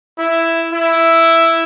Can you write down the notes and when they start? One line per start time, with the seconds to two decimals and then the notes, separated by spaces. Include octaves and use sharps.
0.18 E4
0.73 E4